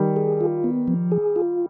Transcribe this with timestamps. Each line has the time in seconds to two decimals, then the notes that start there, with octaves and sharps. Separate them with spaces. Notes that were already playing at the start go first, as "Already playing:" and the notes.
Already playing: D#3 G3
0.16 G#4
0.41 F4
0.64 B3
0.88 F3
1.12 G#4
1.36 F4